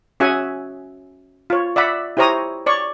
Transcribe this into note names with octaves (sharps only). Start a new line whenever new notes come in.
C#4 F#4 G#4 E5 F#5 G#5
F4 C#5
D5 E5 F#5 B5
E4 G4 C5 C#5 A#5 D#6
C#5 D5 C#6